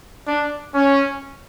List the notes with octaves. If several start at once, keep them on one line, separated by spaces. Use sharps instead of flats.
D4
C#4